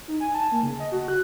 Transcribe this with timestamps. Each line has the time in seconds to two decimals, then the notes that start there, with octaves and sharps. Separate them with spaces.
0.08 D#4
0.20 G#5
0.35 A5
0.52 A#3
0.63 C#3
0.80 D#5
0.92 F#4
1.08 F#6